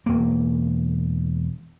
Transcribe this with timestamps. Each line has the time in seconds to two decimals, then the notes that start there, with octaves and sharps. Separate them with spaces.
0.06 E1 A#3